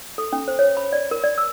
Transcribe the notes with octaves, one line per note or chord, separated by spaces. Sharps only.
A4
C#4
C5
C#5
B5
D5
A#4
D5
E6